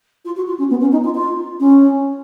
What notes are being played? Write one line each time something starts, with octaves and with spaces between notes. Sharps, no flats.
F4
F#4
F4
C#4
B3
C#4
D#4
F4
F4
C#4